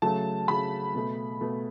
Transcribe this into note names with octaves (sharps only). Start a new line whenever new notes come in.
C#3 F#3 A3 A5
C#3 F#3 A3 B5
B2 A3
B2 A3